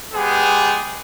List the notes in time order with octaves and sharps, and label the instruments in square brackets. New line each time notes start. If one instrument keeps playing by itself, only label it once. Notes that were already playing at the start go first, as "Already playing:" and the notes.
[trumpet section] G#3 B3 G4 G#4